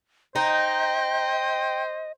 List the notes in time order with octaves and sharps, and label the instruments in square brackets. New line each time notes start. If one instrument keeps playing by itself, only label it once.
[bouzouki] D#4 [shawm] C5 [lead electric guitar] D#5 [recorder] G5